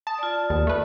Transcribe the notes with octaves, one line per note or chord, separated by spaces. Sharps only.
A5 D#6
F4 D5
D#2
A3 B4